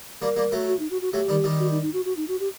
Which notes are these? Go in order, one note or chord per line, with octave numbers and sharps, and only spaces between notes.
G3 A#3 A#4
G3 A#3
F#3 A3
F#4
D#4
F#4
F#4
F#3 A3 G4
D#3 G3
D#3 G3
F#4
D#4
D#4
F#4
F#4
D#4
F#4
G4